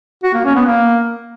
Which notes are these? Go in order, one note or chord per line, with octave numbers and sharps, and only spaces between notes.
F#4
A#3
C#4
B3
A#3